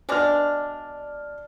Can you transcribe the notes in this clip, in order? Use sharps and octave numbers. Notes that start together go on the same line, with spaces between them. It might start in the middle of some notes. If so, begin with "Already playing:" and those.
B2 G#3 D4 D5 F6